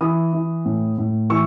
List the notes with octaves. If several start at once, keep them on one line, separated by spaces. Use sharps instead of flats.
E3 B5 D#6
E3
A2
A2
E3 C#6 E6